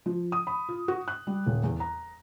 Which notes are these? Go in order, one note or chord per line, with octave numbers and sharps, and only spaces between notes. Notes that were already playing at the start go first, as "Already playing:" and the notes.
F3
D#6
B5
F4
F#4
F#6
G3
D#1
E2
A#5